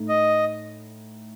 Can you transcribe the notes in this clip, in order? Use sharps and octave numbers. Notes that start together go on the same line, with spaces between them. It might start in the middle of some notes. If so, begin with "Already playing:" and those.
Already playing: A2 A3 D#4
D#5